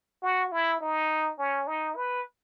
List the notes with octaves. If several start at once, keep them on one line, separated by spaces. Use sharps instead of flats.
F#4
E4
D#4
C#4
D#4
B4